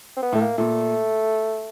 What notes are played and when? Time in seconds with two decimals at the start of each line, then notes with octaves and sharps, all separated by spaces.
0.17 C4
0.23 B3
0.32 A2
0.35 A3
0.41 A#3
0.58 A#2 A3